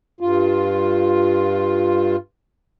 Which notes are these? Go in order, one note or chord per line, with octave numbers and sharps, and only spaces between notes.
G2 F4